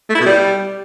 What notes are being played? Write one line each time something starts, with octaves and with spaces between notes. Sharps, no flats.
A3
E4
B2
G3